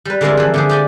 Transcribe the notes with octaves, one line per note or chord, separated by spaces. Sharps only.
G3 B4
D3 G#3 A#3 C4 E4 F4
E3 F3
D3 G4 G#4
G4 D5 G#5